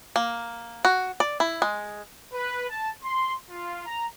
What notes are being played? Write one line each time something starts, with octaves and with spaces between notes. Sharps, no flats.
A#3
F#4
D5
E4
G#3
B4
A5
C6
F4
A#5